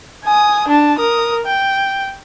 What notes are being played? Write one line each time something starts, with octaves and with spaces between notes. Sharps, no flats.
G#5 D#6
D4 A5
A#4 D#6
G5